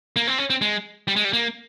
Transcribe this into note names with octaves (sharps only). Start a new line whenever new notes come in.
A#3
C4
C#4
C4
G#3
G3
G#3
G3
A#3